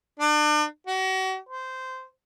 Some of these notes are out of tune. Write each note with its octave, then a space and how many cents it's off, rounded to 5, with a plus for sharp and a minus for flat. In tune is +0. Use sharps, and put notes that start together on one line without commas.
D4 +40
F#4 +35
C5 -15